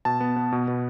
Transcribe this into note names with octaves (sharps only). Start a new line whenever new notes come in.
B2 A5
B3
B3
B2
B2